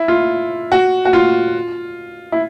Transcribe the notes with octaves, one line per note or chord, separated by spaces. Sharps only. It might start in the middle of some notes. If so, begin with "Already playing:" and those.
Already playing: E4
F4
F#4
F#4
F4
E4